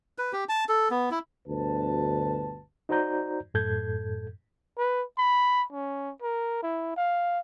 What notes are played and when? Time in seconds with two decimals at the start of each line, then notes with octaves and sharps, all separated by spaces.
0.18 B4
0.33 G4
0.49 A5
0.69 A4
0.91 B3
1.11 E4
1.48 G1 D2 B2 B4 A5
2.89 D#4 F#4 C5 D5 A#5 G6
3.54 F#2 A2 A4 G6 G#6
4.78 B4
5.18 B5
5.72 C#4
6.22 A#4
6.63 E4
6.96 F5